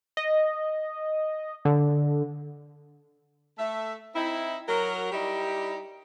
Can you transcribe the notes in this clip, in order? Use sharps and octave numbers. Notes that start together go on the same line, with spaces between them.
D#5
D3
A3 E5
C4 D#4 E4
F#3 A#4
G3 D#4 E4 G4 D5